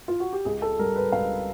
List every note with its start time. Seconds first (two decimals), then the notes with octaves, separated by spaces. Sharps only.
0.08 F4
0.20 F#4
0.33 G4
0.45 C#2 G#4
0.62 A4
0.79 G3 A#4
0.96 B4
1.12 C#2 F5